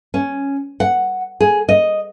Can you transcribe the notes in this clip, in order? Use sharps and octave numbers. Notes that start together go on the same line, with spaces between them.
C#4
F#5
G#4
D#5